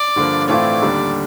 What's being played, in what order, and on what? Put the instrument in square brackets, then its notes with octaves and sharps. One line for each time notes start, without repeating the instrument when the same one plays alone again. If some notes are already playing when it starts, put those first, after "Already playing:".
Already playing: [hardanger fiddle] D5
[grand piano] G2 D3 F3 A#3
[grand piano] A2 E3 A3 C4 F4 [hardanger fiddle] D5
[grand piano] D#2 D3 G3